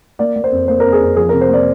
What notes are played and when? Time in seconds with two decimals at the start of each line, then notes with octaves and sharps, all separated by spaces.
0.19 A#3 D5
0.36 A#3
0.44 C5
0.52 F2
0.68 A#3 C5
0.80 A#4
0.85 F2
0.93 G#4
1.01 F2
1.16 F3 G#4
1.29 A#4
1.33 C3
1.41 C5
1.49 A#3 D5